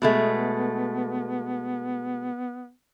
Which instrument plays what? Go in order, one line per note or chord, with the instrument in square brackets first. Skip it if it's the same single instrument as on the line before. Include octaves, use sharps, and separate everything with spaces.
[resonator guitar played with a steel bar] B2 G#3 A3 [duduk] B3